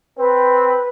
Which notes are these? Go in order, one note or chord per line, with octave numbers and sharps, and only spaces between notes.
C4 B4